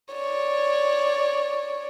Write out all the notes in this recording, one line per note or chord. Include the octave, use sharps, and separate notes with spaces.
C#5 D5